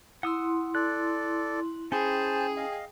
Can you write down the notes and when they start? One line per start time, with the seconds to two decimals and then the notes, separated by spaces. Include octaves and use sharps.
0.23 E4 F#5 C6 D#6 E6
0.75 A4 D5 F#6
1.92 C#4 E4 G#4 C5 G5 A5
2.57 D#5 F5